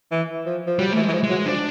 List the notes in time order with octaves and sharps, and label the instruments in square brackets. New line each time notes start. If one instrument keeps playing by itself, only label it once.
[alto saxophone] E3
F3
F3
[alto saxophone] F#3 [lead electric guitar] G3
[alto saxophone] E3 [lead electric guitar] A3
[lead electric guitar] G#3
[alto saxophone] E3
F3
[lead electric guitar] G#3
[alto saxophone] F#3
[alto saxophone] F3 [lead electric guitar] D4